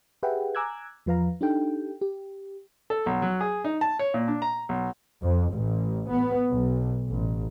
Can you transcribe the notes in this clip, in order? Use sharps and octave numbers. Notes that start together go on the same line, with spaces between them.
G4 G#4 B4 E5 F#5 G5
G#5 A#5 D6 E6 F#6 G#6
E2 F3 B4 F5 A#5
D4 D#4 G4 A4 G5
G4
A4
B1
F#3
G#4
D#4
A5
C#5
A#2
D4
A#5
B1
F2
A1
B3
B1
A1